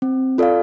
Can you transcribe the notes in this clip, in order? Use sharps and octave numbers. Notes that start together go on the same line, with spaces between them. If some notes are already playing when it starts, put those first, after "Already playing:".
C4
F4 A4 D5 F5